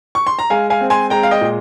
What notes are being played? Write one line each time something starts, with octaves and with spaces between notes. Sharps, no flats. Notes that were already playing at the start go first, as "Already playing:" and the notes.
C#6
C6
A#5
G#3 F5 G#5
F5 G#5
C4
G#5 C6
G#3 G5 A#5
F5
D#5 G5
A#2